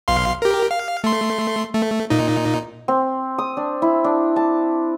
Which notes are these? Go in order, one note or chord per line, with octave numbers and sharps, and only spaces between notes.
B1 F5 C6
G4 A#4
F5
A3 C6
A3
A#2 D#4
C4
D#6
D4
E4
D4
A5